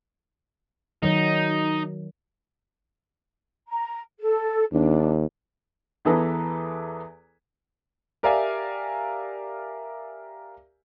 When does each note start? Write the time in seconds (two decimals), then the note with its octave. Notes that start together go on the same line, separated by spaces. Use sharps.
1.03 D#3 F#3 D#4
3.68 A#5
4.20 A4
4.72 D#2 D4
6.05 E2 E3 G#4 A4 B4 A#5
8.23 G4 A#4 D5 E5 F5 G#5